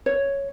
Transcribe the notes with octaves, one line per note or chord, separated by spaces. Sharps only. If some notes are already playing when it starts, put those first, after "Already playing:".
C#5